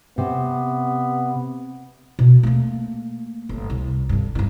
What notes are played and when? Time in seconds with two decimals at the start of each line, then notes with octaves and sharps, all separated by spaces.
0.18 C3 B3
2.19 B2
2.43 A3 A#3
3.49 G1
3.70 C2
4.09 G1 G2
4.35 G2 D#3